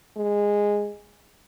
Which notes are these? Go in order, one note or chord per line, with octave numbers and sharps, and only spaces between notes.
G#3